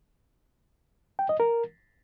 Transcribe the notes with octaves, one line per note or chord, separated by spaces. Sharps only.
G5
D#5
A#4